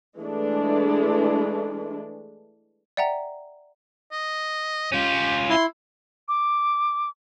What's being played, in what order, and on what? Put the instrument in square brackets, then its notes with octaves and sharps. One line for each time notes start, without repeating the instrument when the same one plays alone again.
[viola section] E3 G#3 A3 D4
[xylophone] D5 E5 F#5 G5 A#5
[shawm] D#5
[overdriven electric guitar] C#4 F4 [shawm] G4
[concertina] E4 [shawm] C6
[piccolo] D6